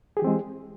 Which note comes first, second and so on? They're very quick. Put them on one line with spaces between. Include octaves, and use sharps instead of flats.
G#4 G4 E3 C4 G#3